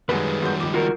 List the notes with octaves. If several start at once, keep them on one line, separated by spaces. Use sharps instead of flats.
F#2 D#3 G3 G#3 B4
F#2 F#4 G6
C#2 F3 D6
F4 F#4 A#4